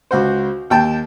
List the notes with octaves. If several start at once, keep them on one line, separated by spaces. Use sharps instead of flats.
C#2 F#4 C5
D#2 G5 A5